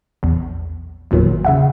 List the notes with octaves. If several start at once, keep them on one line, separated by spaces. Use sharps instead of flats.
A#1 E2
G#1 E2 A#2 D#3 F#3
C#3 E5 F#5